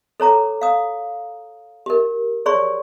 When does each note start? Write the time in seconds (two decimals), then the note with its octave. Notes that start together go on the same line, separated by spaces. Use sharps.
0.20 A4 C#5 A#5 D6
0.61 F5 D#6
1.86 G4 A#4
2.46 G#4 C#5 D5 C6 C#6